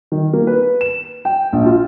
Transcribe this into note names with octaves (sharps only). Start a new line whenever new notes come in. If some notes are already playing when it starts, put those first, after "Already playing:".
D#3
A#3
B4
E7
G5
A#1
F4